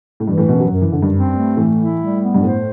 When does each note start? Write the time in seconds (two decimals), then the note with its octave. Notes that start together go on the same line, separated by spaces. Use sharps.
0.20 A2
0.27 G2 E3
0.38 A2
0.49 F#2 B2
0.60 F#3
0.71 F#2
0.82 E3
0.91 F#2 D3
1.02 G2
1.14 C4
1.35 A3
1.56 A2 E3
1.78 E4
2.00 G3
2.21 B3
2.34 G2
2.42 A2 C5